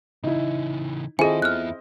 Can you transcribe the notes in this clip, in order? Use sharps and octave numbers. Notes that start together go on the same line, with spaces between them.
C#3 E3 D#4 E4
D#3 C4 E4 F4 G#4 A4 D#5 G#5
E2 B3 F6 F#6